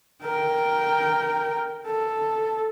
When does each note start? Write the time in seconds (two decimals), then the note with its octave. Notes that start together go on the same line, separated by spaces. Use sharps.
0.23 A#4 G5
1.86 A4